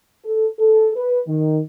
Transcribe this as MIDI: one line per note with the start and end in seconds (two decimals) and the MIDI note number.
0.25 0.46 69
0.59 0.91 69
0.96 1.20 71
1.27 1.60 51